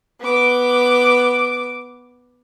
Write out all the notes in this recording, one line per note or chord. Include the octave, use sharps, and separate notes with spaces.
B3 D6